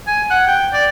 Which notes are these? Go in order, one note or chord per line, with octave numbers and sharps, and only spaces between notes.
G#5
F#5
G5
D5